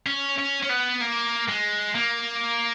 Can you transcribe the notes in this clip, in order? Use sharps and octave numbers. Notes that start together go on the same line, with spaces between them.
C#4
C#4
C#4
B3
A#3
G#3
A#3